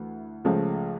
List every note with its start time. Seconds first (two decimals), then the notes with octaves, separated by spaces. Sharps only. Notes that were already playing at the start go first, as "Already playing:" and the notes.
Already playing: D2 E3
0.44 C#2 C#3 F3 A3